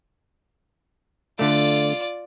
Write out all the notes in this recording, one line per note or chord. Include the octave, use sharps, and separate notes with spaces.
D3 A3 F4 D5